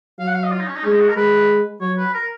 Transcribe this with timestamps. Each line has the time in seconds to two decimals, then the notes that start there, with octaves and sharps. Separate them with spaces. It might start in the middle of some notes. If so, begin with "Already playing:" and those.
0.19 F#3 F5
0.27 F#5
0.35 F5
0.44 D#5
0.52 F4
0.60 D#4
0.68 C#4
0.76 D#4
0.84 G#3 C#4
0.92 D#4
1.00 F#4
1.09 A#4
1.16 G#3 B4
1.81 F#3 C#5
1.98 B4
2.14 A#4